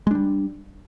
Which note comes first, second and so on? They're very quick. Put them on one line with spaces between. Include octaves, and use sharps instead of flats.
G#3 D4 G3